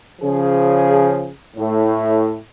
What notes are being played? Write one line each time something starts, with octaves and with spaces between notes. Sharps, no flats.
C#3 F3 G#4
A2